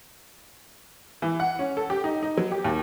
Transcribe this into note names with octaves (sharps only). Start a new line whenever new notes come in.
E3
F#5
C#4
A4
G4
D#4
D#4
F#3
G4
D#2